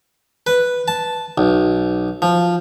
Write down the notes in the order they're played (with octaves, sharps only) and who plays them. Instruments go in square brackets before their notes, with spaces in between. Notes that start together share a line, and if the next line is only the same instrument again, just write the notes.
[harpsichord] B4
A5
B1
F3